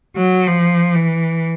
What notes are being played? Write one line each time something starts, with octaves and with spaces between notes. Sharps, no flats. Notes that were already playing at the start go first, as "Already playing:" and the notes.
F#3
F3
E3